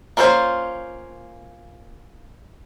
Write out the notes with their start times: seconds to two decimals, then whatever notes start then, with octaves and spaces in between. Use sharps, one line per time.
0.17 A#3 C#4 F4 F#4 C5